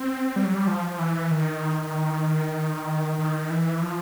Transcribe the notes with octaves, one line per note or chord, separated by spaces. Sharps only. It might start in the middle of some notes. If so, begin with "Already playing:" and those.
Already playing: C4
G3
F#3
G3
F3
E3
D#3
D#3
E3
F3